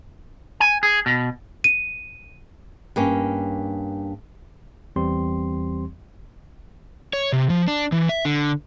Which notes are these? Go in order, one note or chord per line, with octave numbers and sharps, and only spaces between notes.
G#5
G#4
B2
D#7
G2 A#3 C#4
E2 E3 G3 C4 G4 C6
C#5
C3
F3
D4
E3
E5
D3